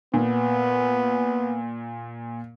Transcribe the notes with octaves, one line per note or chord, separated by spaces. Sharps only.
A#2 B3